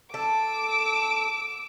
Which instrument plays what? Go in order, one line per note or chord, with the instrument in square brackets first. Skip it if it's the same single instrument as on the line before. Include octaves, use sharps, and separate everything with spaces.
[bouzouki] A4 [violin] D6 E6